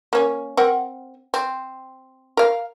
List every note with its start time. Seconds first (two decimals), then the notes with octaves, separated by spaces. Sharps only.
0.13 A#3 C#4
0.57 C4 A#4 F#5
1.34 C4
2.37 A#4 F5